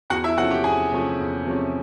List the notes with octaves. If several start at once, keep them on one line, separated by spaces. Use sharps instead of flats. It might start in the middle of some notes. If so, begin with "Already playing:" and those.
E2 F#4 F#5
E4 E5
C3 F3 A3 C#4 F#4 F#5
G4 G5
E2 G#4 G#5
C3 F3 A3 C#4
E2
C3 F3 A3 C#4